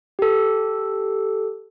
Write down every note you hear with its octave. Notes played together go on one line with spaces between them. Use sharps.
G4 A4